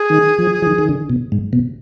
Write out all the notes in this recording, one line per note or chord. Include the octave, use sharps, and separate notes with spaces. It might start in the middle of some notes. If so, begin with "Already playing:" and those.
Already playing: G#4
D#3
F3
F3
D#3
D#3
D3
B2
G#2
B2